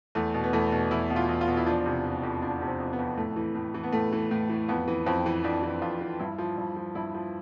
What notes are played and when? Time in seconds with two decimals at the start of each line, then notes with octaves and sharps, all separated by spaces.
0.15 E2 A3
0.34 B2
0.44 B3
0.53 E2 A3
0.72 B2
0.91 E2 E4
1.10 B2
1.16 F4
1.29 E2
1.41 F4
1.48 B2
1.57 E4
1.66 F3 D4
1.86 C3
2.04 F2
2.23 F2
2.42 F3 D4
2.61 C3
2.68 C4
2.80 F2
2.93 B3
2.99 F2
3.17 A2 A3
3.36 E3
3.55 A2
3.74 E3
3.83 B3
3.92 A2 A3
4.12 E3
4.31 A2
4.49 E3
4.68 F2 B3
4.88 E3
5.06 F2 C4
5.26 E3
5.44 F2 D4
5.63 E3
5.82 F2 F4
6.01 E3
6.19 G2 E4
6.38 F3
6.57 G2
6.76 F3
6.95 G2 E4
7.15 F3